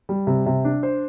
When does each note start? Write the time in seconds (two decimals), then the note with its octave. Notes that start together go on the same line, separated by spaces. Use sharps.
0.09 G3
0.27 C3
0.46 C3
0.65 D4
0.83 C5